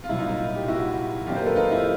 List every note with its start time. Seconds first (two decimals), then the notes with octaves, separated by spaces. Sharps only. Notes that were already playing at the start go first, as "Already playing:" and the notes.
0.04 F4
0.09 C2 A#2 F#3 E4
0.19 D#4 F4
0.28 E4
0.56 G4
0.68 E4 F#4
1.26 F#2 D#3 F#3 A#3 D4 F4 G4
1.36 A#4 C5
1.46 A4 B4
1.56 D#4 F4
1.72 E4